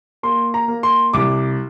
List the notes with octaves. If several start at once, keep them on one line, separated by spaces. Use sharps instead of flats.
A#3 C6
A#5
A#3
C6
C2 D6